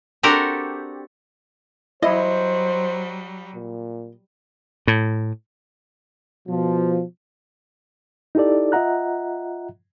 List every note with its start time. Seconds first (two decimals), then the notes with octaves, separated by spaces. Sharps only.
0.23 C4 D4 F#4 G4 A4 A#4
2.02 F#3 G3 E4 C5 D#5
3.54 A#2
4.87 A2
6.48 B2 F3
8.35 D#4 E4 G4 A4 D5
8.72 F4 D#5 E5 F#5 A#5 F#6